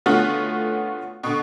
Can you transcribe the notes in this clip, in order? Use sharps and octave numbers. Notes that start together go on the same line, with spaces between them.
D3 A3 B3 C#4 F4 F#4
B2 D3